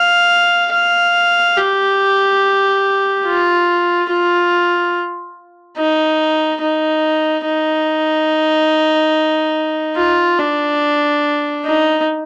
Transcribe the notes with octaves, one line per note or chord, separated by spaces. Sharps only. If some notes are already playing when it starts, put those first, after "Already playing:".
Already playing: F5
F5
G4
F4
F4
D#4
D#4
D#4
F4
D4
D#4